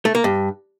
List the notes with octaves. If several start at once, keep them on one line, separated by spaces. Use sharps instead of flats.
A3
A#3
G2